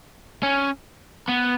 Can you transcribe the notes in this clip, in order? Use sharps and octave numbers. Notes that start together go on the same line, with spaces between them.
C#4
B3